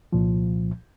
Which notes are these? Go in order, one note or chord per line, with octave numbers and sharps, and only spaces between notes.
C2 A#2 F3